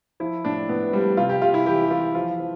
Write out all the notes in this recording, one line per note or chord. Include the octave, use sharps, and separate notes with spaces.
F3 E4
A2 D4
A2 B3
F3 G3
C3 F4
G4
C3 F4
E4
E3 G4
G4
E3 F4
F3 F4
F3